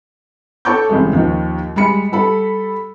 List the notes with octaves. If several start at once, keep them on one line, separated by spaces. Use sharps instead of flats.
A4 C#5 A5 C#6 D6 G6
A1 C3 G3 G#3
D#2 D#3 F3
G3 G#3 B5 C#7
G3 A4 B5